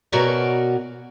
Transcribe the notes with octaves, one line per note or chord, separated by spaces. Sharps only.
B2 C#4 F#4 A#4 C#5 D5